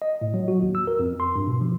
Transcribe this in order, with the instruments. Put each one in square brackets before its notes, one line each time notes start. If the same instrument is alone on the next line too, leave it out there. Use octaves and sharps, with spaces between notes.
[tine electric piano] D#5
A2
F#3
F#4
D#2
E6
A#4
F2
C6
G2
B2
F3